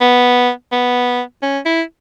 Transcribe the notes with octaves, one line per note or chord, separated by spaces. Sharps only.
B3
B3
C#4
E4